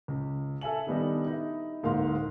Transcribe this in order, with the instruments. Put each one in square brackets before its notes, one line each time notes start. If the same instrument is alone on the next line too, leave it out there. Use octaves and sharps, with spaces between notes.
[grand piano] C#2
A4 E5 G#5 F#7
D#3 G3 B3 D4 D#4
D#4 E4
D1 G#2 A#3 D#4 F5 C6